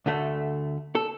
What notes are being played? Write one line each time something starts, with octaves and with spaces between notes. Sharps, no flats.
D2 D3 A3
A4